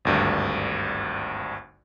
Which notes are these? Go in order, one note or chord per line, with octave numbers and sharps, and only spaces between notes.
G#1 D2 G2